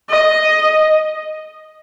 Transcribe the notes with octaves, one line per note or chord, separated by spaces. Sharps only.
D#5